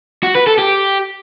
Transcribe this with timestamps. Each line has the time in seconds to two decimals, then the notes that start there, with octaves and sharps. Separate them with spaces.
0.23 F#4
0.35 B4
0.46 A4
0.58 G4